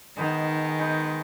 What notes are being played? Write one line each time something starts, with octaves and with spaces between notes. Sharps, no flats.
D#3 G#3 B3 D#4 G#4
G#3 B3 D#4 G#4